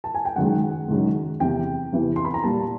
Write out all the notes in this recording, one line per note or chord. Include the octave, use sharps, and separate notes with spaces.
A5
G#5
G5
F#2 D#3 G#3 F#5
F#2 D#3 G#3
E2 C3 E3 G5
E2 C3 E3
C6
B5
A#5
A#2 G3 A5